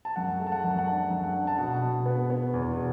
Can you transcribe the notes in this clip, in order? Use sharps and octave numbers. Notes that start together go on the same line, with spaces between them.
A5
F#2 F#5
A3
A5
F#5
F#2
F#5
D4 A5
F#2
F#5
D4
A5
B2 F#5
B2
B3
B3
E2
B2